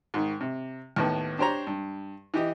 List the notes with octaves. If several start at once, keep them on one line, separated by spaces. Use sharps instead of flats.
G#2 D#3
C3
D#2 A2 B3
D4 G4 C5 C#5 A#5
G2
E3 G4 D#5